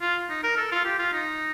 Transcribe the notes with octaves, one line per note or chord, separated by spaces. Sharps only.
F4
D#4
A#4
A4
F4
G4
F4
D#4